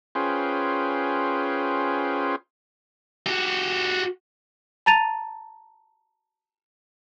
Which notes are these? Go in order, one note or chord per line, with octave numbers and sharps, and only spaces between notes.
C#4 F4 G#4 B4 C5 G5
F#4 G4
A5 A#5 A6 D#7 F7